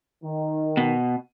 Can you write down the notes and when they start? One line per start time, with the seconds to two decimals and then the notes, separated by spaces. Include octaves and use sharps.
0.24 D#3
0.77 B2